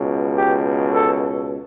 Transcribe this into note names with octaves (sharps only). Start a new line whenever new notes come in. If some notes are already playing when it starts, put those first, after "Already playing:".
Already playing: C#2 B2
G4
A4